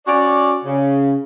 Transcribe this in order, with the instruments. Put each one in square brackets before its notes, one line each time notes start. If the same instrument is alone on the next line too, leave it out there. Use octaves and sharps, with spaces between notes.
[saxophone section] C#4 F#4 D5
C#3